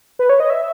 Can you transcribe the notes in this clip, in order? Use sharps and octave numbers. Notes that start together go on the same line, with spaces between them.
B4
C#5
D#5
E5